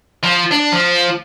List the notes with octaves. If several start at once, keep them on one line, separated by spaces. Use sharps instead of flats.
F3
D4
F3